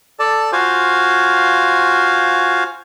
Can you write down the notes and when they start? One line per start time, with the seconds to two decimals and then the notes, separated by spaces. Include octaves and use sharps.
0.19 A4 D5 A5
0.52 F4 F#4 C5 F5 G#5